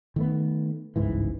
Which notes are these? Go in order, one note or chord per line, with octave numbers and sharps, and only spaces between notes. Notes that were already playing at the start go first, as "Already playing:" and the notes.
D#3 A3 B3
G1 C#2 G#2 E3